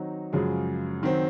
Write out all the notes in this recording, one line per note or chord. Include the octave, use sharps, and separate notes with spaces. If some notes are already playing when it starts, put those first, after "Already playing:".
Already playing: D#3 F#3 C4 D#4
F#2 C#3 F3 G#3
D#3 F#3 C4